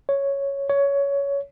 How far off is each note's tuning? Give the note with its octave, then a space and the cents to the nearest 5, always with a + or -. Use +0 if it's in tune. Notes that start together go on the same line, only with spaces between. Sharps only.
C#5 +0
C#5 +15